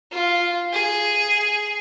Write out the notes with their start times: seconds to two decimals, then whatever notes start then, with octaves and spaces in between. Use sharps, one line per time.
0.11 F4
0.72 G#4